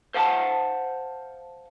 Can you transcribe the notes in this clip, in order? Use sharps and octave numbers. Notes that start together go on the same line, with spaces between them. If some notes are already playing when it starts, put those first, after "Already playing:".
C5 F5 F#5 A5